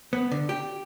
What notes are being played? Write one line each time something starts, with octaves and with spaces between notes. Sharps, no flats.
B3
D3
G4